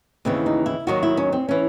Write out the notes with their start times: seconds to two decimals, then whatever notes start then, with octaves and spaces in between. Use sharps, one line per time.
0.25 D#2 C#3 E3 C4
0.46 D#4
0.66 E4
0.87 D#2 D#3 F#3 F#4
1.03 E4
1.17 C#4
1.33 C4
1.49 E3 C#4